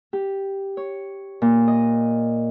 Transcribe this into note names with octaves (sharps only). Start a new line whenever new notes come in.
G4
C#5
A#2
D#5